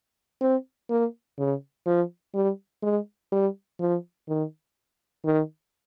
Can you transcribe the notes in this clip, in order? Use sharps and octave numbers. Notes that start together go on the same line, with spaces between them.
C4
A#3
C#3
F3
G3
G#3
G3
F3
D#3
D#3